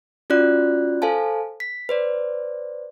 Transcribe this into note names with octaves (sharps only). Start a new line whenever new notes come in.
C#4 F4 F#4 D5 F#6
A4 C5 F5 G#5 A5
B6
B4 C5 D5